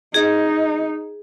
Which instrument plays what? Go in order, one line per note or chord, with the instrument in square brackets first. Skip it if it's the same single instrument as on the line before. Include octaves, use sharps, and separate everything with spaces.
[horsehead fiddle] D#4 [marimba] G#4